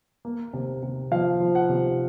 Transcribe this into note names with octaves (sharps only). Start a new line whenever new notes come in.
A#3
C3
C3
F3 F5
F3
F#5
C3